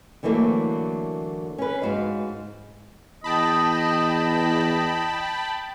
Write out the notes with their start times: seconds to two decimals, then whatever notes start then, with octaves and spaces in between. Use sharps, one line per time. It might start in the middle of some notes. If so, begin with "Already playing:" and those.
0.23 D3 E3 F#3 A3 A#3
1.58 C#4 B4
1.82 G#2 F#4 F5
3.24 E2 D#5 G5 A5 B5